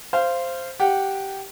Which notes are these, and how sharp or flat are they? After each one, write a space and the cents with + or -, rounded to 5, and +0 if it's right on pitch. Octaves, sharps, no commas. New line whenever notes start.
C5 +0 F5 -20
G4 -10 F#5 -15